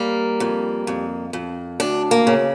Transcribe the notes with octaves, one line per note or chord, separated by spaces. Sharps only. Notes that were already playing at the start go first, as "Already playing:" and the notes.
Already playing: G3 A#3
F2
F2
F2
D2 D4
A#3
C#3